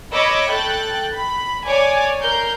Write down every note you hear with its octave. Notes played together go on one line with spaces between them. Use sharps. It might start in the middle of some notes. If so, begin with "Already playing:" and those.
C#5 D#5 B5 C#6 D6 E6
A4 G5 F#6 A6
B5
C#5 D5 G#5 D6
A#4 G6 C7